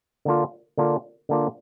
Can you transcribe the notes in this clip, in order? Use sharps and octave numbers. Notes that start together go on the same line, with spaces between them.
D3 A#3 D4 F4
D3 A#3 D4 F4
D3 A#3 D4 F4